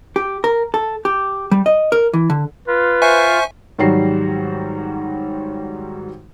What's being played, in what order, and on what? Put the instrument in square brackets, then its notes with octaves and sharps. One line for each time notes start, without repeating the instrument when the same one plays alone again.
[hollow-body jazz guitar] G4
A#4
A4
G4
G3
D#5
A#4
E3
D3
[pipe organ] F4 [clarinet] B4
[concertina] C5 C#6 [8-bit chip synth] E5 G#5
[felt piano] G#2 D#3 F#3 G3 F#4 C7